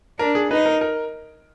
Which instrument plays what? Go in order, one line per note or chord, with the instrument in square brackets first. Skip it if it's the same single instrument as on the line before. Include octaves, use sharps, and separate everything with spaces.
[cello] D4 [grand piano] A#4
[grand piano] G#4
[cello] D#4 [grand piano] B4
[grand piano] A#4
A#4